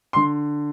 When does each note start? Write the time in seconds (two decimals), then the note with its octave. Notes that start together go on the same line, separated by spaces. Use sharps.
0.13 C6
0.16 D3